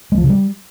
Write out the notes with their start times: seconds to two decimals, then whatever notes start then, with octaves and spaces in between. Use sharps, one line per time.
0.12 G#3
0.18 F3
0.24 C#3
0.30 G3